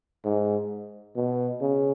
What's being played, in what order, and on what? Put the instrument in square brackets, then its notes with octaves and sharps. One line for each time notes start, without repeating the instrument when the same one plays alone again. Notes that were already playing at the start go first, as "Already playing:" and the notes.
[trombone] G#2
B2
C#3